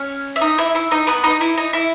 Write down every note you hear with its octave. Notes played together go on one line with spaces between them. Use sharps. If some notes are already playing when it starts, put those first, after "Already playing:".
Already playing: C#4 C#5
E5
D#4 D#5
E4 E5
E4 E5
D#4 D#5
B3 B4
D#4 D#5
E4
D#4
E4